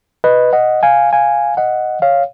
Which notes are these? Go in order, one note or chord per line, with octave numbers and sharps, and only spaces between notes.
B4 D#5
D#5 F#5
F5 G#5
F5 G#5
D#5 F#5
C#5 F5